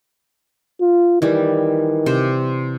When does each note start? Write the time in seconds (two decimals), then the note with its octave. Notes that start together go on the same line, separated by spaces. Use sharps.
0.81 F4
1.22 D#3 E3 G3
2.06 C3 C5